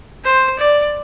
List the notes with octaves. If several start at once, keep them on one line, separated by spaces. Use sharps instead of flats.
C5
D5